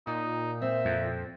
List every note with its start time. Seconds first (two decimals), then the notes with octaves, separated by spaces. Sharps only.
0.07 A#2 D#4
0.62 C4 E5
0.85 F2